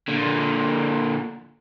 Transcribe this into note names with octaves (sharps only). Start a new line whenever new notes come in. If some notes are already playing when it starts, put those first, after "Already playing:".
A#2 D3